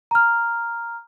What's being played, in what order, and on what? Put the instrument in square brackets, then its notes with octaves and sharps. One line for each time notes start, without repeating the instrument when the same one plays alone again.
[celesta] A#5 F6